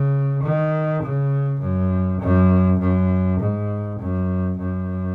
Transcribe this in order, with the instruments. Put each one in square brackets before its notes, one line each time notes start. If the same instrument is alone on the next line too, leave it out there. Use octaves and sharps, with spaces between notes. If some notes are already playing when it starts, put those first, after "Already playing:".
Already playing: [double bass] C#3
D#3
C#3
F#2
F#2
F#2
G#2
F#2
F#2